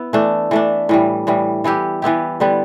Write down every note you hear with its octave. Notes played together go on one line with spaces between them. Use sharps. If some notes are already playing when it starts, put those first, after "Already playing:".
Already playing: B3 E4
E3 A3 D4
E3 A3 D4
A2 E3 G3
A2 E3 G3
E3 B3 E4 G4
E3 B3 E4 G4
D3 G3 B3